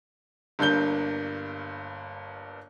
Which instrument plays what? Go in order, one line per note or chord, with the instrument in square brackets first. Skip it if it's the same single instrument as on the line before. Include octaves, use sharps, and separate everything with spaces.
[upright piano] G1 G2 A#3 G6 G7